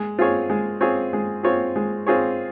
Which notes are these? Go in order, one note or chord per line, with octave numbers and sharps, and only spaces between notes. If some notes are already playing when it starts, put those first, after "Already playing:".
Already playing: G#3
C4 F4 G#4 C#5
G#3
C4 F4 G#4 C#5
G#3
C4 F4 G#4 C#5
G#3
C4 F4 G#4 C#5